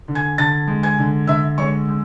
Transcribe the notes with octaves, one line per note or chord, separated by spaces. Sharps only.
D3
G#5 G#6
D3 A5 A6
G#3
G#5 G#6
D3
D3 E5 E6
G#3 C#5 C#6
G#3